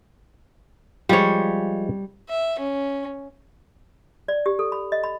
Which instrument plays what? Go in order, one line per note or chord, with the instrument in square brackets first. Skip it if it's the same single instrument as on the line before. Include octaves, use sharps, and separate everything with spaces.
[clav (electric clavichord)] F3 G#3 F4 [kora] G3 C#5
[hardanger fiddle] E5
C#4
[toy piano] D5
G4
A4
B5
D#5
B5